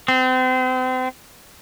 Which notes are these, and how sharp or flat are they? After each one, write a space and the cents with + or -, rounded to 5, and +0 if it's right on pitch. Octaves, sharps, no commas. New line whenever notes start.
C4 -35